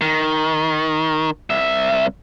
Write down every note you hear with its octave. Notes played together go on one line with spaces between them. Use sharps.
D#3
C2 E5